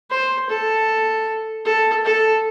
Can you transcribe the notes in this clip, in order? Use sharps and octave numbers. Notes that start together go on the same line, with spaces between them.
C5
A4
A4
A4